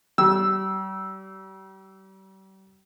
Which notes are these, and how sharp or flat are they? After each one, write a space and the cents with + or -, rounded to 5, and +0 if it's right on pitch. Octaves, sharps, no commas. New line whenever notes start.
G3 -35 E6 +0